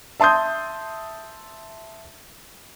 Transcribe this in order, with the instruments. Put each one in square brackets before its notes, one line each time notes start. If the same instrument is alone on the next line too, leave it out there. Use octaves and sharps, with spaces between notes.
[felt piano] E5 A5 C6 D#6 G6